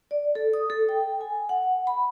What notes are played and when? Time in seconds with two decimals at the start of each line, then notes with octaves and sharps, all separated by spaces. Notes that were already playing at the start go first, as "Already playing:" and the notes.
0.11 D5
0.35 A4
0.53 D#6
0.70 A4
0.89 G5
1.21 G#5
1.49 F#5
1.87 B5